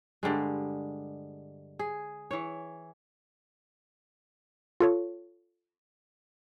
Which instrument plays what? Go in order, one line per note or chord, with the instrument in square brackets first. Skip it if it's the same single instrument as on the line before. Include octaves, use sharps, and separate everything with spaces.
[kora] G2 D3 G3 G#3
G#4
E3 C#5
[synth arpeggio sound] F4 A4 C#5